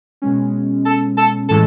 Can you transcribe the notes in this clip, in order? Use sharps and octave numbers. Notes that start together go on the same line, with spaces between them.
B2 G#3 C#4
A4 A5
A4 A5
A2 E3 G#3 A4 A5